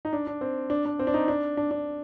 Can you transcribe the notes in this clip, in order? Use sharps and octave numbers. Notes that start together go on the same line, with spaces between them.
D#4
D4
D4
C4
D4
D4
C4
D4
D#4
D4
D4
D4